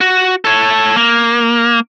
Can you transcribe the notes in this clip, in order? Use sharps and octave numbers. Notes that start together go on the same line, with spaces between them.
F#4
A4 C#5
A#3